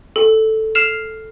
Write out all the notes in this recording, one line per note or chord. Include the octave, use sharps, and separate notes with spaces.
A4
F6 C7 E7 F7